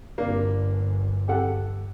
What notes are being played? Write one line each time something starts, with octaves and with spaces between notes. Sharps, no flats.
G1 A#3 D4
G4 A4 F#5